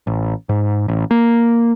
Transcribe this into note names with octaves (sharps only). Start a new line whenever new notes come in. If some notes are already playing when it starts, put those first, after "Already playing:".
A1
G#2
A1
A#3